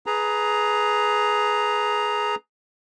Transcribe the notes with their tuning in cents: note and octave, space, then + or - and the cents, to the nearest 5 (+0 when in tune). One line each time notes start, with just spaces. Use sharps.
G#4 +15 B4 +0 A#5 +0